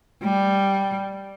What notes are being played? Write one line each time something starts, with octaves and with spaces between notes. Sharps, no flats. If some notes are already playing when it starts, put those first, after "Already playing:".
G3